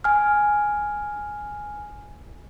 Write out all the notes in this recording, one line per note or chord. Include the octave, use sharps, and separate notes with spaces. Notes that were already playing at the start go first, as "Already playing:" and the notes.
G#5 F6